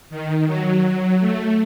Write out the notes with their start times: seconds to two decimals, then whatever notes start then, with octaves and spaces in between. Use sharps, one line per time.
0.10 D#3
0.47 F#3
0.83 F#3
1.20 A3